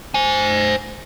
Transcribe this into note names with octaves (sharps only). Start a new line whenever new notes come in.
C5 G#5